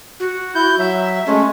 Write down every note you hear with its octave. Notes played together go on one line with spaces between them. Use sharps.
F#4
E4 G6
F#3 E5
G#3 A3 C#4